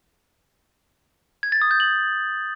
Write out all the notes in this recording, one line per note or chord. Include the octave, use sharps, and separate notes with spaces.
G#6
A6
D#6
G6
F#7